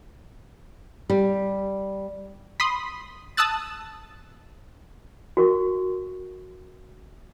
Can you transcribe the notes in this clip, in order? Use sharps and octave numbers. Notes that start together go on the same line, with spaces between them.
G3
B5 C6 D#6
A5 D#6 E6 F#6 A6
F#4 A#4 C#6